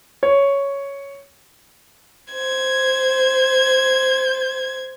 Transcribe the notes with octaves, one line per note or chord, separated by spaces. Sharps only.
C#5
C5 G#6